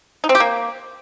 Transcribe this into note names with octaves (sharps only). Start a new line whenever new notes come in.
D#4
C4
G4
A#3